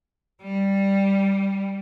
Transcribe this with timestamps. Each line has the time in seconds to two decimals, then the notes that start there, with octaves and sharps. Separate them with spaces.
0.42 G3